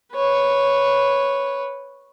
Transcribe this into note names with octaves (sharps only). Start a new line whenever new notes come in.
B4 C#5